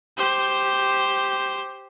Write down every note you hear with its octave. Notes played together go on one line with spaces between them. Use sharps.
G4 C5